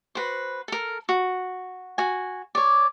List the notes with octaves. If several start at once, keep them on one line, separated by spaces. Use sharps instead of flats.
F#4 B4 C5
A4 A#4
F#4
F#4 G#5
C#5 D5